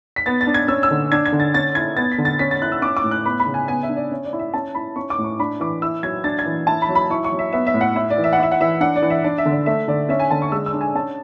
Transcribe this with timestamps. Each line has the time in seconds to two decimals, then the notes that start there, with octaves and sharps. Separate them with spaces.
0.16 B6
0.26 B3 A6
0.41 A6
0.47 D4
0.54 G#6
0.68 C#4 E6
0.83 E6
0.91 D3
1.12 D4 G#6
1.26 G#6
1.32 D3
1.40 A6
1.54 C#4 A6
1.75 E4 G#6
1.97 B3 A6
2.12 B6
2.18 D3
2.25 A6
2.39 C#4 B6
2.51 A6
2.62 E4 F#6
2.72 E6
2.82 C#4 D6
2.97 D6
3.04 A2
3.11 F#6
3.25 B3 B5
3.40 B5
3.47 C#3
3.54 G#5
3.68 B3 G#5
3.83 E5
3.89 D4
3.96 D5
4.12 C#4
4.25 D5
4.33 E4
4.39 E5
4.54 C#4 A5
4.75 E4 B5
4.96 C#4 C#6
5.10 D6
5.18 A2
5.24 C#6
5.40 D4 B5
5.60 E3 D6
5.82 E4 E6
6.03 F#3 G#6
6.24 D4 A6
6.39 G#6
6.46 E3
6.67 E4 A5
6.82 B5
6.89 F#3
6.95 B5
7.10 E4 C#6
7.24 C#6
7.32 F#3
7.39 E5
7.53 B3 E5
7.67 E5
7.74 A2
7.81 F#5
7.96 E4 E5
8.10 D5
8.18 E3
8.24 E5
8.33 F#5
8.39 E4 E5
8.52 F#5
8.60 E3 E5
8.81 D4 F#5
8.96 D5
9.02 E3
9.10 E5
9.24 D4 D5
9.38 E5
9.45 D3
9.52 D5
9.66 A3 E5
9.88 D3 D5
10.09 C#4 E5
10.19 G#5
10.31 D3 A5
10.42 C#6
10.52 G#3 E6
10.66 E6
10.74 D4
10.81 G#5
10.95 C#4 A5